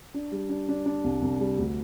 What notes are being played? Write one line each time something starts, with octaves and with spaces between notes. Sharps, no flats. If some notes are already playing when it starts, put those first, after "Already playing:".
D4
G3
D4
D4
D4
C2
C2
G3
D2